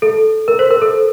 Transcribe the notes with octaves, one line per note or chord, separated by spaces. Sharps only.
A4
A#4
C5
A#4
A4